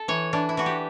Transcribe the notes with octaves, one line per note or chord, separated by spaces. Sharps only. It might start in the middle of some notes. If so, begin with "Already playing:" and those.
Already playing: A4
E3 C#5
E3 D4
E4
E3 F#4
G4